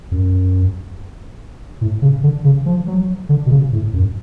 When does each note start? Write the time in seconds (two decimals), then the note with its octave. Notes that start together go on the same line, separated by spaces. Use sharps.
0.11 F#2
1.81 A2
2.02 C#3
2.23 D3
2.44 C#3
2.66 F3
2.88 F#3
3.29 D3
3.46 B2
3.51 C#3
3.73 A2
3.93 F#2